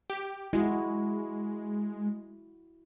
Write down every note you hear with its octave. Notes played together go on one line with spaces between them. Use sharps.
G4
G#3 E4 F#4